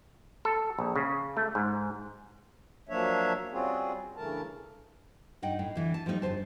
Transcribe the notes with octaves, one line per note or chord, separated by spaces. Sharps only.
A4
A#1
C#3
A3
G#2
F3 F#3 A#3 D4 C#5 E5
G3 C4 C#4 F4 F#4 G#4
G2 C#3 E3 A3 A#4 A5
G2 D#4 F#5 G5
A2
D3 E3
A5
F3 G3 A3 C#4 D#4
G2 C#3 F#3 C5 A5